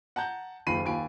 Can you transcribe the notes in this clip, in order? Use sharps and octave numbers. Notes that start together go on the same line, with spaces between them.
F#5 A5 A#5 G6
F#1 D#2 F4 B5 C7 D#7
D#2 F4 G#5 B5 D7